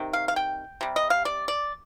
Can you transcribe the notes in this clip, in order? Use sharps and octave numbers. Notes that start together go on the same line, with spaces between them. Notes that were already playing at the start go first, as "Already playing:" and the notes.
Already playing: C3 D#3
F5
F5
G5
C3 G3
D#5
F5
D5
D5